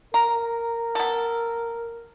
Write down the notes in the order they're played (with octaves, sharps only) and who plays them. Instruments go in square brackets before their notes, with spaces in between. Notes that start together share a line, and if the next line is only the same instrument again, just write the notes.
[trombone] A#4 [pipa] A#5
[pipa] B3 A4